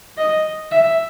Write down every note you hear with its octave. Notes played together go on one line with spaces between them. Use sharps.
D#5
E5